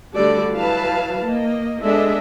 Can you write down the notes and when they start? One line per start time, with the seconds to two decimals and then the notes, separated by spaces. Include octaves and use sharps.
0.14 D3 G3 A3 F#4 A4 D5
0.55 E3 F#3 B4 F5 A5
1.26 A#3 D#5
1.83 G#3 B3 D4 A4 D#5 E5